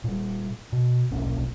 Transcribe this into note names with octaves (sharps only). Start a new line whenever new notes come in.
A#2 G3
B2
D#1 B1 A#2 C#4